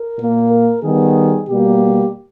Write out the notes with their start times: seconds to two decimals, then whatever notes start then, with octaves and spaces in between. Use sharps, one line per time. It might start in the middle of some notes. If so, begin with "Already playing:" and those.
Already playing: A#4
0.16 A#2 A#3
0.49 A#4
0.82 D#3 G3 B3 G#4
1.49 B2 G3 A#3 G4